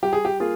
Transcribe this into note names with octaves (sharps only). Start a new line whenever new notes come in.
G3 G4
G#4
G4
A#3 F4 G#4